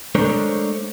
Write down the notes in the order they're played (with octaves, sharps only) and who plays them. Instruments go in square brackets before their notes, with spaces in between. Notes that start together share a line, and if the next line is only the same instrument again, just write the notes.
[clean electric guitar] G#3 A3 D4 A#4 C5 C#5